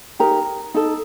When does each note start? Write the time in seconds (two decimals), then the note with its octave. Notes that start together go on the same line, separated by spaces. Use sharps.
0.19 D#4 G4 A#4 A#5
0.74 D#4 A4